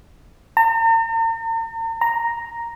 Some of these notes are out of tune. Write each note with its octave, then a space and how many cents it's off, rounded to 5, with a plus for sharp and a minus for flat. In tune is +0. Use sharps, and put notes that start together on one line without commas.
A#5 -45
A#5 +0